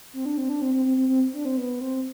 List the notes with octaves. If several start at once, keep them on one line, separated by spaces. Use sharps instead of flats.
C4
D4
C4
D4
C4
C4
C4
C4
C4
D4
C4
B3
C4